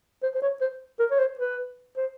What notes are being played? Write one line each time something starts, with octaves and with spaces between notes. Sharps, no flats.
C5
C5
C#5
C5
A#4
C#5
C5
B4
C5